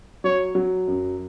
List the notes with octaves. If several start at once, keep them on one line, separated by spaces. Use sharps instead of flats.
F#3 C#5
F#3
F#2